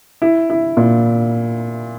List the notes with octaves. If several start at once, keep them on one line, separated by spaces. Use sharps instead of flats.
E4
E4
A#2